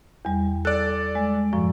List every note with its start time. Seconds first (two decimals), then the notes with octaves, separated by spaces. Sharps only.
0.25 E2 G3
0.65 A4 D5 F#6
1.15 G#3
1.53 F#2 A2 F3